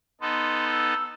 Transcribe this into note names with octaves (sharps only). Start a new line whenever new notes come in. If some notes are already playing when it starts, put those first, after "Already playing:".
B3 D#4 A4 C6
E6